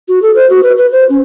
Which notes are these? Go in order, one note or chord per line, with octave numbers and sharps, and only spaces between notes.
F#4
A4
C5
F#4
B4
B4
C5
C#4